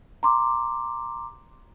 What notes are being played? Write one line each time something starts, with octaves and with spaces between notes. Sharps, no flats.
A#5 C6 D6